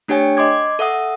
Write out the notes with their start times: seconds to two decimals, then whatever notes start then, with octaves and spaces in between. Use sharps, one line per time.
0.08 A3 D4 G4 C#5 G5 G#5
0.37 D#5 C6 D6 G#6
0.79 A4 E5 F#5 D#6